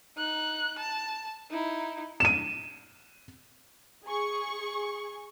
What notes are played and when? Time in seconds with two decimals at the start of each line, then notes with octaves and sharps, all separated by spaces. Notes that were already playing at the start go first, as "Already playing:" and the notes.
0.17 D#4 F#6
0.79 A5
1.50 D#4 E4
2.20 D#7 E7
4.05 G#4 C#6